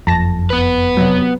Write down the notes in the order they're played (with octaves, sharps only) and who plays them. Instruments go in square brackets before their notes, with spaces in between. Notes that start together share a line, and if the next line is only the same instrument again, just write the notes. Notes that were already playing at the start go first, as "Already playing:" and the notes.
[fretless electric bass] F#1 F2 [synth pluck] A5 A#6
[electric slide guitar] B3 B4
[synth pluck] C3 F#3